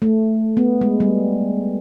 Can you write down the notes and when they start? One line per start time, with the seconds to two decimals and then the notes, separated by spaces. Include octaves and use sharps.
0.02 A3
0.57 B3
0.81 G#3
1.00 G3